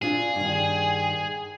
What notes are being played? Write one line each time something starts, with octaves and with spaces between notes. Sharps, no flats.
C4 D4 F4 G#4
G2 D#3